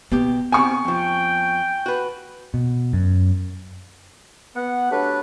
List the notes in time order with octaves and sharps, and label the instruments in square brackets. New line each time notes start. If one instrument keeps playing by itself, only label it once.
[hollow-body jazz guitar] B2 G4 [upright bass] B3
[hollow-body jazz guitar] C3 C4 [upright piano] G#5 C#6
[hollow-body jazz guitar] F2 F3 [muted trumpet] G5
[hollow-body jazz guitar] F#4 B4
[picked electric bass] B2
F#2
[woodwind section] B3 F#5
F#3 A3 D4 G4 B4